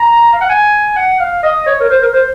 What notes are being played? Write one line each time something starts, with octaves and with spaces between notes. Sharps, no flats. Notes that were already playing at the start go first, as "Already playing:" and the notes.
Already playing: A#5
F5
F#5
G#5
F#5
F5
D#5
C#5
A#4
C5
A#4
C5